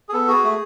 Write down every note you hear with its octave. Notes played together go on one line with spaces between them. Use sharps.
G#4
B3 A4
F#4 G#4
A3